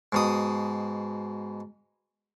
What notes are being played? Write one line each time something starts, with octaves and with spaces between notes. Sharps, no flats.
G#2 B2 D#6